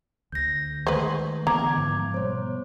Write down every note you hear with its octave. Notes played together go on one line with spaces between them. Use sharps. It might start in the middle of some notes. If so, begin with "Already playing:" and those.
D2 G6 A#6
D#3 G#3 A3 B4 C5
D3 E3 B3 A#5 D6 G#6
G#2 F3
B2 G3 B3 C5 C#5